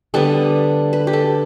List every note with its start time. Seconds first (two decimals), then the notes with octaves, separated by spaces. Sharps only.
0.14 D3 G3 B3 A4
0.93 B4
1.07 G4
1.13 A4